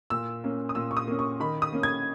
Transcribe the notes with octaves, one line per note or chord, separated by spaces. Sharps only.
A#2 E6
A#3 C#4
D#6
A#2 E6
C#6
D#6
A#3 C#4
C#6
D#3 B5
D#6
A#3 C#4
G#6